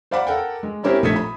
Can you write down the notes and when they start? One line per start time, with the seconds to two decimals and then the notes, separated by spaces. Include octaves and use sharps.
0.11 C5 D5 F5 F#5 B5 D6
0.27 A4 A#4 F#5 G5
0.63 G#3
0.83 C4 C#4 E4 G4 A#4 C5
1.03 A#1 A3 D#4 D#6 G#6 B6
1.16 B5